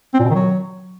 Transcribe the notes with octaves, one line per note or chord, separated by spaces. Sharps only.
C4
A#2
B2
D#3
F#3